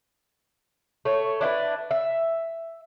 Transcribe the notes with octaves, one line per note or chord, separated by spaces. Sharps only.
A3 C#5
D4 E4 G4 B4
E5